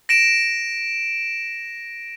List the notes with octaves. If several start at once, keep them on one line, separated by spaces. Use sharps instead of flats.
A#6 D7 E7